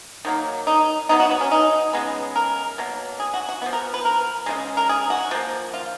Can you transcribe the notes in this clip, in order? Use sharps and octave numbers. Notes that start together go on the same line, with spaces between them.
D#3 F#3 A#3
D#4
B2 F#3 B3 D#4
F#4
B3
C#4
D#4
C#3 G#3 B3
A#4
B2 F#3 A#3
G#4
F#4
F#4
F3 B3 F#4
A#4
B4
A#4
C#3 F3 G#3
A#4
G#4
F#4
F3 A#3
F4